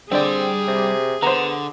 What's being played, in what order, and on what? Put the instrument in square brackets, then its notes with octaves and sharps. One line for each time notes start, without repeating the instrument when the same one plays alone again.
[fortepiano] D3 D5 [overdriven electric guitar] G3 G5 [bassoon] C4 [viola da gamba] G#4
[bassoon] C3
[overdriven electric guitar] D3 [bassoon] B3 [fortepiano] C5 A#5